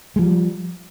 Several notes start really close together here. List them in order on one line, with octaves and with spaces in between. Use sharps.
G#3 F3 G3